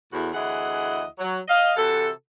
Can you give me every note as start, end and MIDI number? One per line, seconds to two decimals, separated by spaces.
0.12 0.28 40
0.12 0.28 45
0.12 0.28 66
0.33 1.04 38
0.33 1.04 52
0.33 1.04 64
0.33 1.04 68
0.33 1.04 75
0.33 1.04 78
1.19 1.38 54
1.48 1.72 75
1.48 1.72 77
1.76 2.08 48
1.76 2.08 52
1.76 2.08 66
1.76 2.08 69